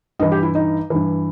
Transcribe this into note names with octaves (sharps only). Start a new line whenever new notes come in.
G2 E3 D#5
G4
E4
D#4
G2 E3